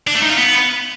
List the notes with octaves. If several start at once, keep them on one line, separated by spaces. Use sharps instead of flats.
D4
A3
D#4
F4
B3